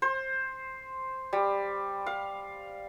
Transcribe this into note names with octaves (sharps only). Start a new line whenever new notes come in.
C5
G3
F5